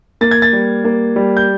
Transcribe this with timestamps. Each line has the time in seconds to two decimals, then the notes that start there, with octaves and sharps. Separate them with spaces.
0.21 A#3 A6
0.31 G#6
0.42 A6
0.53 G3
0.85 A#3
1.16 G3
1.37 G6